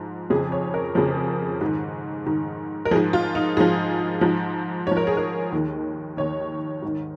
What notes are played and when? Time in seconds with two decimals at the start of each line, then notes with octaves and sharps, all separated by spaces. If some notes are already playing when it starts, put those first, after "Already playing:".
Already playing: G#2 F3
0.30 F2 C#3 F3 G#4
0.52 C#5
0.74 A#4
0.95 F2 C#3 F3 G#4
1.61 G#2 D#3
2.26 G#2 D#3
2.85 A#4
2.91 F3 G#4
2.96 G#2
3.13 F4
3.35 D#4
3.57 G#2 F3 G#4
4.21 G#2 F3
4.87 G#2 F3 C#5
4.97 A#4
5.07 G#4
5.17 A#4
5.52 D#2 D#3
6.17 D#2 D#3 C#5
6.82 G#2 D#3